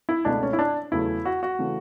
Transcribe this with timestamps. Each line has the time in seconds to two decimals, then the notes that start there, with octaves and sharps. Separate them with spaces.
0.09 E4
0.25 C#2 B2 A3 D4
0.42 C#4
0.53 E4
0.59 D4
0.92 E2 C#3 F#3 A3 E4
1.25 F#4
1.43 F#4
1.59 C#3 E3 A3